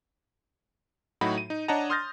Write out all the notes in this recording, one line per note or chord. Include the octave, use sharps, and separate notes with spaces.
A2 F#3 D#4 F#4 B5
D#7
D#4
D4 C#5 D#5 F#5 A5 A#5
C6 D#6 F6 G6 A6 A#6